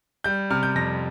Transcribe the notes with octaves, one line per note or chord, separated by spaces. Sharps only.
G3 G6
C3 F6
G6
F2 A#6